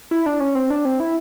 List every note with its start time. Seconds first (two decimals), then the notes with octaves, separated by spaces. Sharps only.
0.11 E4
0.26 D4
0.40 C#4
0.55 C4
0.70 D4
0.85 C4
1.00 E4